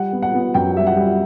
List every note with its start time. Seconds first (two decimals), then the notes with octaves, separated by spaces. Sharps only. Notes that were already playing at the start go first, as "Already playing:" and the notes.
Already playing: G3 F#5
0.12 B3
0.22 F#5
0.34 B3
0.54 F#2 G5
0.75 G3 E5
0.87 F#5
0.96 G3